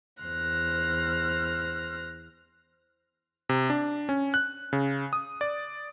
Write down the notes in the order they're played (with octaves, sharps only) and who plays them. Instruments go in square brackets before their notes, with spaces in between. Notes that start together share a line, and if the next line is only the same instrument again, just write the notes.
[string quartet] E2 C5 F6 F#6 A#6
[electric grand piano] C3
D4
C#4
F#6
C#3
D#6
D5